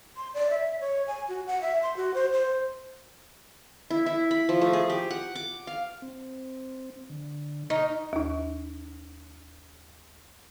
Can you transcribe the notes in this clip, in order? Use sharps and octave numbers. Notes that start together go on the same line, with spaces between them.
C6
D5
E5
C#5
G#5
F#4
F#5
E5
C6
F#4
C5
C5
E4
E4
B5
F3
A3
G#4
G4
F#5
D6
F5
C4
D3
D#4 C#6 F6
D#2 D#4